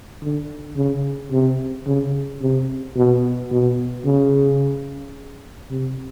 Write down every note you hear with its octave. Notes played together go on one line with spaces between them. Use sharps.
D3
C#3
C3
C#3
C3
B2
B2
C#3
C3